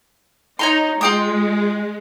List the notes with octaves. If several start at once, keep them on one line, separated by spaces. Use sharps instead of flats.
D#4 C#5 A#5 C6
G#3 F4 G5 D#6